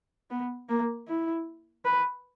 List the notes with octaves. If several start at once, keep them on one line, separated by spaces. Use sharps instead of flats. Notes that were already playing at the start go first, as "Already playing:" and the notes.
B3
A#3
E4
B4